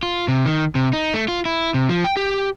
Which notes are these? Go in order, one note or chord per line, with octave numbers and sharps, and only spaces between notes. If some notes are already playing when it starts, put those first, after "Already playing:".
F4
C3
D#3
C3
D#4
A3
F4
E4
C3
F3
G5
G4